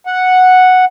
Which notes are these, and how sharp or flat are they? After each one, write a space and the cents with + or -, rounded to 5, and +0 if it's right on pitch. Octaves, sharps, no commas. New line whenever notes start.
F#5 -5